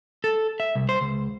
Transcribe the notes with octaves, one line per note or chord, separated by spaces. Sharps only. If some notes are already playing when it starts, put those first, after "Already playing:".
A4
E5
C2
C5
C#2